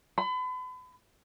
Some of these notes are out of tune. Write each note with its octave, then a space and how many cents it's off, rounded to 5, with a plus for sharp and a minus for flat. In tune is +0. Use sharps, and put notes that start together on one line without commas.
B5 +35